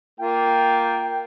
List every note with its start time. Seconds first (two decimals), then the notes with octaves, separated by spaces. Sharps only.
0.20 A#3 F4 G5